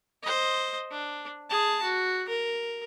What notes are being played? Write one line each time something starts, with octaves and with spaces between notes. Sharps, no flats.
C5 D#5
D4
G#4 A5
F#4
A#4